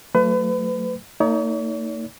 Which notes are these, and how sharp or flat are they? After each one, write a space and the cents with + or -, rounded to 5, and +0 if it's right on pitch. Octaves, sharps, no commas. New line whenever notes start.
F#3 +0 A3 +30 B4 +35
A#3 -40 D#4 +20 C#5 +45